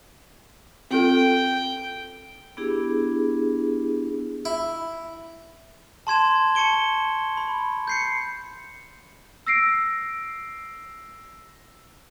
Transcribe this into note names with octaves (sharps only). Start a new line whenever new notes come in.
C4 F4 A4 G5
B3 D4 E4 G4 G#4
E4
A5 C6 G#6 E7
A5 C#6 C#7 D7 G7
B5
G6 C7 C#7
E6 A#6 C7 D7